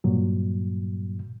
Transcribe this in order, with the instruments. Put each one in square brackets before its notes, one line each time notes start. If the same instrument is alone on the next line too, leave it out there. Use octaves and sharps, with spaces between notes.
[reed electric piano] G2 A#2 F#3